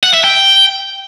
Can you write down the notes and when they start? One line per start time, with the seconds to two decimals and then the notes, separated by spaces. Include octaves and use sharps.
0.03 F#5
0.14 E5
0.24 G5